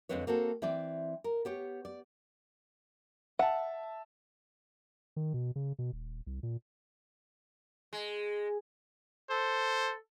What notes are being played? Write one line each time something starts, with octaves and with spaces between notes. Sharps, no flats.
F2 D3 G#3 C4 B4 C#5
A#3 C4 F#4 A4
E3 C4 D5 G5
A#4
B3 G4 C#5
D5
E5 F#5 A5
D#3
B2
C#3
B2
D#1
C2
A#2
G#3
A4 C5